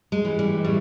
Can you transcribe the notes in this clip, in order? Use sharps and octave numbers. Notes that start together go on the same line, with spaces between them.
G#3
E3
G3
A2 G3